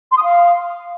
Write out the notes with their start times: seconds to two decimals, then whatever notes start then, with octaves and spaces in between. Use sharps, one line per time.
0.11 C6
0.17 D#6
0.23 F5